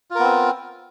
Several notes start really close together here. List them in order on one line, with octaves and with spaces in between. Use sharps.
F4 A#4 B3 C4